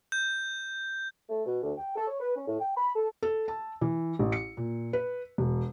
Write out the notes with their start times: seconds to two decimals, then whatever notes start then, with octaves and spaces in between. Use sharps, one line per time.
0.12 G6
1.29 A3
1.46 B2
1.62 D2
1.78 G5
1.95 A4
2.08 C#5
2.20 B4
2.36 C#4
2.48 A2
2.60 G5
2.76 B5
2.95 A4
3.23 A4
3.48 A5
3.81 E3
4.19 A1
4.32 C#7
4.57 A#2
4.93 B4
5.38 E1